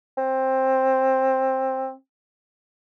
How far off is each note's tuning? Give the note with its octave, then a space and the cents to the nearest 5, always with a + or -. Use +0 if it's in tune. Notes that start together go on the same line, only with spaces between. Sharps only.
C4 +15